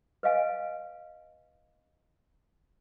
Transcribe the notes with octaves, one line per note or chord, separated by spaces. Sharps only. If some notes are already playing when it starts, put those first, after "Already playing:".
B4 D#5 F5 G#5